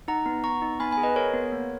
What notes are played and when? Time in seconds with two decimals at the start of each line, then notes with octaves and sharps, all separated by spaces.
0.08 D#4 F#5 A#5
0.26 B3
0.44 B3 A#5 C#6
0.62 D#4
0.80 B3 G#5 B5
0.91 G#5 B5
0.97 G#4
1.03 B4 D#5
1.16 G#4 A#4 C#5
1.34 B3
1.52 A#3